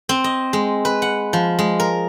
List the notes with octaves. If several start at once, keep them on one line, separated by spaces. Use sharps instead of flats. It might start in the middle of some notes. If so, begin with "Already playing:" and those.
C4
D#5
G#3
B4
F#5
F3
G#3
A#4